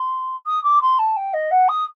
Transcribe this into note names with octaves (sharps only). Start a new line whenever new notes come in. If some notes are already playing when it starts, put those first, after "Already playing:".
Already playing: C6
D#6
D6
C6
A5
G5
D#5
F#5
D#6